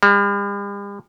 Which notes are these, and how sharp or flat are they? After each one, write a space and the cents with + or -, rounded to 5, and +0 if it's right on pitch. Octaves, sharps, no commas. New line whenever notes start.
G3 +45